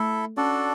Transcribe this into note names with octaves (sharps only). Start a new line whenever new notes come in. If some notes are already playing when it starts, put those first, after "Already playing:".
Already playing: A3 E4 A4 E5
C#4 D4 F#4 A4 D5